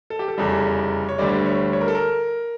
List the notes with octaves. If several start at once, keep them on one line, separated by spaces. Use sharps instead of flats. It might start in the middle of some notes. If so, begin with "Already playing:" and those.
A4
G4
A4
F1 E2 C#3 G3
C#5
D2 D3 G3 D5
C#5
C#5
A#4
A4
A#4